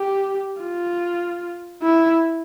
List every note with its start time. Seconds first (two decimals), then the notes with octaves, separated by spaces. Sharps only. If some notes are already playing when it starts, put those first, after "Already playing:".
Already playing: G4
0.62 F4
1.83 E4